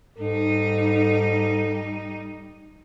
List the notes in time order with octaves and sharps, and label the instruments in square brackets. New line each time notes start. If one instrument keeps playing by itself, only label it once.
[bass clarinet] G#2 [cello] G3 D#4 [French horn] A4